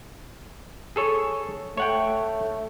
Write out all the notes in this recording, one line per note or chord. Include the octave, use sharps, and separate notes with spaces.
G#4 A4 C#5
A3 C#5 F#5 G5